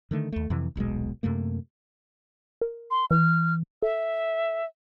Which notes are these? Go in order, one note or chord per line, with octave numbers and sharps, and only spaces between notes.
D3 D#3 A3
D#2 A3
F2 C3 E3
D#1 B1 B2 G#3
F#2 C3 A3 A#3
A#4
C6
E3 F6
A4 E5